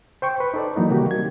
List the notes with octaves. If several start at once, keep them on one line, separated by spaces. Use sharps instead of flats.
C5 G5 C#6
B4
D#4 A4 D5
E3 F#3 A#3 D#4
C3 D#3 G3 A#3 F#4 G4
G#6